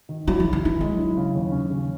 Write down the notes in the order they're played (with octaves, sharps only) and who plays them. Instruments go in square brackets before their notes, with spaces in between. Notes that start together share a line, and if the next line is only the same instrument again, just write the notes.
[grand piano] D#3
[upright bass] F#3 [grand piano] E4
[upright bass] E3
[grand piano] E4
[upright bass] D#3
[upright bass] E3 [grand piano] E4
[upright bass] F#3 [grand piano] G#3
[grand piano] E4
C#3
D#2
C#4
C#3